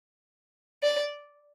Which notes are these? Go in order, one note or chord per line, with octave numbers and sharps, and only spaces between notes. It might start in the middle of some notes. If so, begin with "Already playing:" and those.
D5